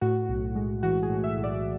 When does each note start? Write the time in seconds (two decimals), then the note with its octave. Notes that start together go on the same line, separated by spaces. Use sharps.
0.01 A2 F#4
0.29 B1
0.55 G#3
0.83 E3 F#4
1.03 G#4
1.10 A2
1.24 E5
1.37 B1
1.44 D5